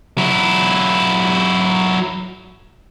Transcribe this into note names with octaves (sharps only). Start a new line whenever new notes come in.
F#3 E4